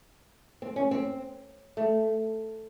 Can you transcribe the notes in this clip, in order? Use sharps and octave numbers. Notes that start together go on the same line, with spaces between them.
C4
C#4
C4
A3